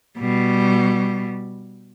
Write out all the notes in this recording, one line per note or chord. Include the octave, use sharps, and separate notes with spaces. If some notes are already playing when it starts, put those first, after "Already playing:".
B2 G3